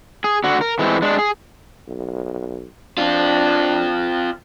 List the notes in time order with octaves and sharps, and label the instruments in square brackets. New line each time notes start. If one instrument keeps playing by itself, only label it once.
[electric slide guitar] G#4
D3 F#4
A#4
E3 G#3 A3 C4
G#3 D4
G#4
[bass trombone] B1
[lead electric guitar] C4 F4 [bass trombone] D4